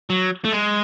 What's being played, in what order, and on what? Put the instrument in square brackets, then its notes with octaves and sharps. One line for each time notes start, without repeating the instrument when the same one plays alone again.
[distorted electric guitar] F#3
A3
G#3